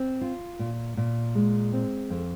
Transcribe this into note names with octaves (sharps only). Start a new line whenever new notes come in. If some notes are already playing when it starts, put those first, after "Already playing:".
Already playing: C4
F4
A#2
A#2
G#3
C4
F2